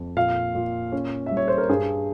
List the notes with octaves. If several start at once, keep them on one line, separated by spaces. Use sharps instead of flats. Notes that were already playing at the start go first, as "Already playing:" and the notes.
Already playing: F2
A#2 F5
A#2
C#4
G3 E5
C#5
C5
A#4
G2 G#4